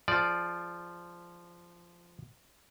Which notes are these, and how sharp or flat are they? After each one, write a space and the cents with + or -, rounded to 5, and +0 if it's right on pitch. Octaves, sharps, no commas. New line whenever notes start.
F3 -10 G#4 +25 D5 +0